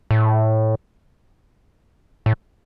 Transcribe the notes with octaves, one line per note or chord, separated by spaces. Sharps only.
A2
A2